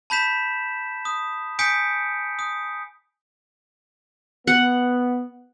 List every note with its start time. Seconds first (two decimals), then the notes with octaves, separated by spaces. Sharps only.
0.10 A5 B5 G6 B6 E7
1.05 D#6
1.59 G#5 D#6 G6 B6 C#7 D7
2.39 D#6
4.47 B3 F#5